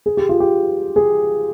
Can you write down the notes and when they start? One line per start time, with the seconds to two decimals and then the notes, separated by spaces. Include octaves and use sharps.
0.06 G#4
0.17 G4
0.29 F4
0.40 G4
0.96 G#4